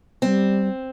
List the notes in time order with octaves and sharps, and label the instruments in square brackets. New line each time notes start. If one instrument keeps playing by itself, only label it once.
[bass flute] G3 [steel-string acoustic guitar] C4